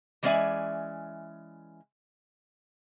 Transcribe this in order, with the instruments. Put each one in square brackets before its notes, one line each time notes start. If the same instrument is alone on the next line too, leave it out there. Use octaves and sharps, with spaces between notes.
[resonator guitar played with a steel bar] E3 G#3 C#4 D5 E5 G#5